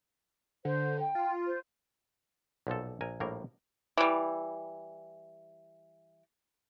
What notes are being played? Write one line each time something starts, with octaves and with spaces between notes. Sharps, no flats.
D3 C5
G5
F4
C5
B1 A#2 F3 A4
A#1 A#4 G#5
A#1 A2 G3 A#3 A#4
E3 G3